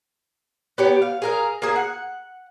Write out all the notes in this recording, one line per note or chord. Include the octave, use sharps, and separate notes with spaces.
B3 G4 C#5
F5
G#4 A#4 F5
A#3 G#4
F#5